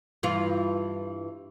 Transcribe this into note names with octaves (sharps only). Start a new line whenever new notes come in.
G2 E3 F4